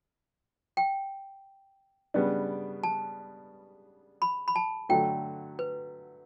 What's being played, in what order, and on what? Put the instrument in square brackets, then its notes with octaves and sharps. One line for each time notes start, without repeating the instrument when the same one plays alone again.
[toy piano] G5
[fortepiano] C#3 G3 B3 D4
[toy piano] A5
B5
B5
A5
[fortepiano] D3 F#3 A3 [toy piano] G5
[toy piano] B4